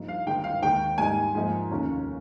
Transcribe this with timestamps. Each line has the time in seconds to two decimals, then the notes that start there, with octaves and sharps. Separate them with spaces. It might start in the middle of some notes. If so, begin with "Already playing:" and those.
Already playing: G2 F3 A#3 D#4
0.08 F5
0.27 G#1 G2 D#3 G#3 G5
0.44 F5
0.62 D#2 D#3 G#3 G5
0.98 G#2 G3 A#3 D#4 G#5
1.35 G#2 F3 A#3 D#4
1.71 F1 D#2 D#3 A#3 C#4